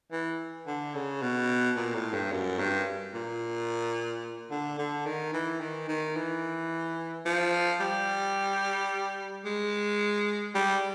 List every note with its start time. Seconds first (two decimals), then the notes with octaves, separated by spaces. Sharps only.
0.12 E3
0.67 D3
0.95 C#3
1.22 B2
1.77 A#2
1.95 A2
2.13 G2
2.32 F#2
2.59 G2
3.14 A#2
4.51 D3
4.79 D3
5.06 D#3
5.33 E3
5.61 D#3
5.88 D#3
6.16 E3
7.26 F3
7.80 G3
9.45 G#3
10.55 G3